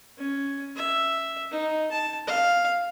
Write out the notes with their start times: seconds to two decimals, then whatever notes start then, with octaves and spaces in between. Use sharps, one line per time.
0.18 C#4
0.76 E5
1.51 D#4
1.91 A5
2.27 F5